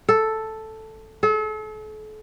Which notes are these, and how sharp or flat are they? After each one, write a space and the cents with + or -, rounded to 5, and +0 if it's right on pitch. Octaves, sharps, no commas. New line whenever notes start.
A4 +0
A4 -40